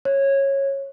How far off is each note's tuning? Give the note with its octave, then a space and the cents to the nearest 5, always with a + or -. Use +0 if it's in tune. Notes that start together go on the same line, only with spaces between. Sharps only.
C#5 -15